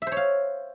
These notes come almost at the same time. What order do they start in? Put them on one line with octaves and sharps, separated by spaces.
E5 C5 C#5 F5